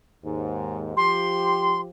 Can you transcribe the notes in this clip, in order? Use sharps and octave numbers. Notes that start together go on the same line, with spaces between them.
D#2 G#2
F3 G4 C6